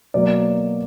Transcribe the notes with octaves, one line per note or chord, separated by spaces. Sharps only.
B2 F#3 A#3 D5